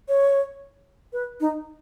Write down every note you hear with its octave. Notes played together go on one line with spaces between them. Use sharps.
C#5
B4
D#4